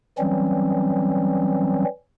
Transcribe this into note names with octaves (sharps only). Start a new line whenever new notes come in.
E3 F#3 G3 C4 C#4